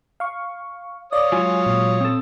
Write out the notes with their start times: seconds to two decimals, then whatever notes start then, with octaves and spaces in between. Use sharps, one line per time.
0.20 F5 C#6
1.13 C#5 D5 F5 D#6
1.32 F#3 G#3 F4 G#5
1.66 A#2
2.01 C4 A4